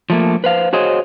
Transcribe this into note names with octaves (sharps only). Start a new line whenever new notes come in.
F3 A3 A#3
B4 C5 F5
F#4 G#4 C5 C#5 D#5